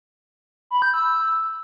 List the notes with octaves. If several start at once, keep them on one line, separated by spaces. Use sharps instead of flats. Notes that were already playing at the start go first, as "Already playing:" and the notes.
B5
G6
E6